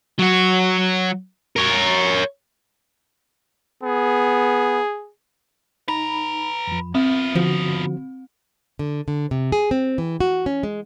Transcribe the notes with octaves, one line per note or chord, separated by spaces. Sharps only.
F#3 F#4
A#4 C#5
B3 G#4
D#4 B4 A#5 B5
F2 F3
B3 C4 F4 E5
D3 F3 F#4
D3
D3
C3
G#4
C4
E3
F#4
C#4
G#3